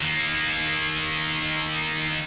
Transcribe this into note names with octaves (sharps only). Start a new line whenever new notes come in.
D#3 A#3